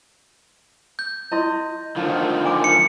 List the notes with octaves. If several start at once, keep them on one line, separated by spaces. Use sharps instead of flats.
G6
E4 D#5 C6
D3 D#3 F3 F4
G#5 D6
C#7